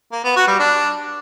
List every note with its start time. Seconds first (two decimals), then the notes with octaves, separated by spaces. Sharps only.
0.12 A#3
0.24 B3
0.36 F#4
0.48 G3
0.59 D4